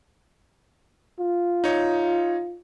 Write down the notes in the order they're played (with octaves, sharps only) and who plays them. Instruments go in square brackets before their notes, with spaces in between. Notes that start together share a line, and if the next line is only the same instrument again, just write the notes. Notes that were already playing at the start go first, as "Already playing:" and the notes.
[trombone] F4
[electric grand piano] D#4 C#5